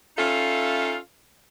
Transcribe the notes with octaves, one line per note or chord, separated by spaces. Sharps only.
C#4 D#4 F4 A4 E5 F5